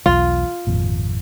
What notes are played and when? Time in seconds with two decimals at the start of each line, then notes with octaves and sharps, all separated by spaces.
0.06 B1 E2 F4
0.67 G#1 F2 A#2